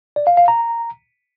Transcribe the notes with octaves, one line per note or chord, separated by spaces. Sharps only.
D5
F5
F5
A#5